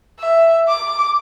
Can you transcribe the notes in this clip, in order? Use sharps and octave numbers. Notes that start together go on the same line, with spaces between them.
E5
D6